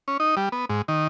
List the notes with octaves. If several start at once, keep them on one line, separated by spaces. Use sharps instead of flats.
C#4
D#4
G3
B3
G#2
D#3